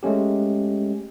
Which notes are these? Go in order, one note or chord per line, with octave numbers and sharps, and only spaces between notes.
G#3 A3 C#4 G4